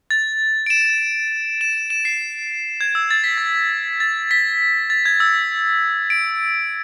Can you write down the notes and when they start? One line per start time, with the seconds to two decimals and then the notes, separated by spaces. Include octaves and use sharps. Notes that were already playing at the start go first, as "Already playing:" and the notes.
0.11 A6
0.66 D7
0.70 E7
1.61 E7
1.90 E7
2.05 C7
2.81 G#6
2.95 E6
3.11 A6
3.24 B6
3.38 A6
4.00 A6
4.31 B6
4.90 A6
5.06 G#6
5.20 E6
6.10 D7